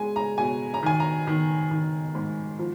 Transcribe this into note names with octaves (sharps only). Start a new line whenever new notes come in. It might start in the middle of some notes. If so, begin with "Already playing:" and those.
Already playing: G#3 G#5
A#5
B2 G#5
A#5
D#3 G#5
A#5
D#3
D#3
G#2
F3